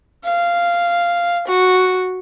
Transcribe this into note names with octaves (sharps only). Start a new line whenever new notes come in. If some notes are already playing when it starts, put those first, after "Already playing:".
F5
F#4